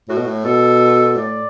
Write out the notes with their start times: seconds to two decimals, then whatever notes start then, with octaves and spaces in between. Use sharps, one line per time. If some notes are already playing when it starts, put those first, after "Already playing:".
0.09 A2 F#4
0.17 B2
0.25 A2
0.44 B2 A4
1.16 A2 D5